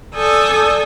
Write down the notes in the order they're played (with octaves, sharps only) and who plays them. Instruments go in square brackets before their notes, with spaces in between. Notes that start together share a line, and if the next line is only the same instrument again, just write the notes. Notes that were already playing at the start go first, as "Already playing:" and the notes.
[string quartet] A4 D5 G#5 D#6 E6 G6